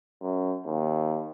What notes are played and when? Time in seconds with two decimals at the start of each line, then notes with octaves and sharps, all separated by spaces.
0.22 F#2
0.66 D#2